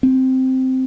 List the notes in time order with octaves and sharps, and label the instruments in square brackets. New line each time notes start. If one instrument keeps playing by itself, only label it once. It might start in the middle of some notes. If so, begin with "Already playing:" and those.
[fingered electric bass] C4